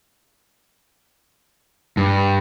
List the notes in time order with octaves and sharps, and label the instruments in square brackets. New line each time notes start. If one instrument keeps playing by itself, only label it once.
[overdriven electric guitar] G2